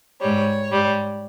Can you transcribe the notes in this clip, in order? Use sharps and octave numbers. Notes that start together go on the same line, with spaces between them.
G#2 G3 C#5
G#2 G3